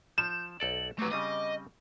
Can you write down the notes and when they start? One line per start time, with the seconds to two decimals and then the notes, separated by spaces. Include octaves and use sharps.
0.18 F3 G6 E7
0.60 B1 A4 D5 F#7
0.99 F#3 A3 C4 B4 D6
1.12 C#3 G3 C4 D#5